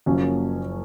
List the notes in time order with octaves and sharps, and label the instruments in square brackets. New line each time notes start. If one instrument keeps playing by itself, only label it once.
[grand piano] F#1 F#2 F3 A#3 C#4